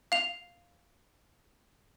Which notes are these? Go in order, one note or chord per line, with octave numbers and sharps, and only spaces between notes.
F5 F7